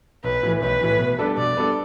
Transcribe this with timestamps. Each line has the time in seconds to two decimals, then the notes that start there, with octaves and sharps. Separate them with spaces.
0.24 B1 B4
0.43 A2 E3
0.61 B1 B4
0.81 A2 E3
0.99 B2
1.19 G3 B3 D4 A4
1.37 B2 D5
1.56 G3 B3 D4 A4